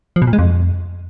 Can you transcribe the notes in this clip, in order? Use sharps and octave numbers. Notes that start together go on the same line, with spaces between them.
F3
B2
A#2
G#3
F2